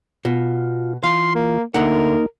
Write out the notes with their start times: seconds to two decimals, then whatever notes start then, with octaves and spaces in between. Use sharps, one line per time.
0.25 B2 F4
1.04 E3 F4 F5 C6
1.35 A#3
1.74 D2 D3 A#3 D#4 A#4 F#5